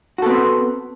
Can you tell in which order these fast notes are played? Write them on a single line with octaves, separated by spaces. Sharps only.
F#4 A4 B3 C4